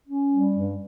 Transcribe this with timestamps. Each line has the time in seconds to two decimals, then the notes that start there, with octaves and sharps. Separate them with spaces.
0.08 C#4
0.31 G3
0.54 G2